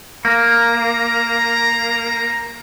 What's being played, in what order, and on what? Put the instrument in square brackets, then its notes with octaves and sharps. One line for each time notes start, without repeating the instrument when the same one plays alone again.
[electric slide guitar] A#3 [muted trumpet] A#5